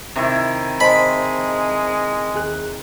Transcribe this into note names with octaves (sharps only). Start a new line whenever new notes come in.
C3 D#3 E4
G#3 C5 D#5 A5 B5
D#2 G#4 F#6